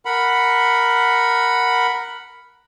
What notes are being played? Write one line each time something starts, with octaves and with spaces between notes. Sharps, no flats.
A#4 F#5 B5